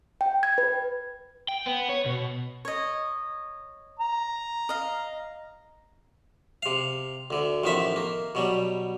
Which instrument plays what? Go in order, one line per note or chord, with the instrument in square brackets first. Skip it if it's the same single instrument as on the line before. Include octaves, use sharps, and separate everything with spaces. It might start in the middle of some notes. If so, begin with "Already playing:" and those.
[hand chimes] G5
G#6
B4
[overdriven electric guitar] G5
B3
C#5
B2
[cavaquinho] C#5 D#5
[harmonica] A#5
[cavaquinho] D#5 F5
[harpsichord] C3 F5
D2 D3
A1 D#3 F3 B3 E5
A#3
B2 F#3 G3